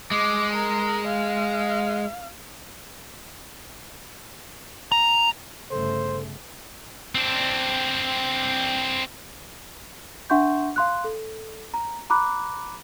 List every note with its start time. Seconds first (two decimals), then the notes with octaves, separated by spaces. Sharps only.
0.11 G#3 D6
0.54 A#4
1.07 F5
4.92 A#5
5.71 G1 C#3 A3 A4 C5
7.15 C4 D4
10.30 D4 E5 F#5 C6 C#6 G6
10.76 F5 C6 F#6
11.04 A4
11.74 A#5
12.10 A#5 B5 D6 F#6